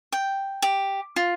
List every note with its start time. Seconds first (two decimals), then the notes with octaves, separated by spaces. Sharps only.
0.12 G5
0.62 G4
1.16 F4